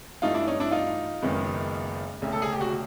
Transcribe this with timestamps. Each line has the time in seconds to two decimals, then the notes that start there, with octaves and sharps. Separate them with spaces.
0.22 G2 E3 A3 D#4 F4
0.34 D4 E4
0.47 C#4 D#4
0.60 D4 E4
0.71 D#4 F4
1.22 F#1 F#2 D#3 G#3 B3
2.22 E1 D2 C#3
2.33 A4
2.42 G#4
2.52 G4
2.61 F#4